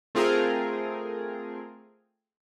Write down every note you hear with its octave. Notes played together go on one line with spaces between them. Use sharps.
A3 C4 F4 G#4 A#4